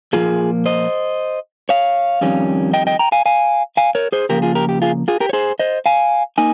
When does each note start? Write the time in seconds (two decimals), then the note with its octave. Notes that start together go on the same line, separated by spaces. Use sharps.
0.13 A#2 F3 A#3 F4 G#4
0.66 C5 D#5
1.69 C#5 F5
2.21 F2 D#3 G3 C#4
2.74 D#5 G5
2.87 D#5 G5
2.99 G5 A#5
3.12 F5 G#5
3.26 F5 G#5
3.77 F5 G#5
3.95 A#4 C#5
4.12 G#4 C5
4.29 C#3 F3 A#3 G4 A#4
4.42 F4 G#4
4.55 G4 A#4
4.69 G4
4.82 F4 G#4
5.08 F4 G#4
5.20 G4 A#4
5.29 C#5
5.33 G#4 C5
5.59 C5 D#5
5.86 F5 G#5
6.38 A#3 D#4 G#5